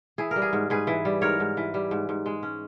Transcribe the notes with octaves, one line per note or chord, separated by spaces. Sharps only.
E3 G#4
G3 A#4
G#4
G#2
G#2 G#4 B4
E3
G3
G#2 A#4 C#5
G#2
E3
G3
G#2
G#2
G#3
C#4